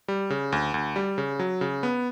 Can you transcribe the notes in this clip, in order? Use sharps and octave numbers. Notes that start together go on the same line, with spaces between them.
G3
C#3
D2
D2
G3
C#3
F#3
C#3
B3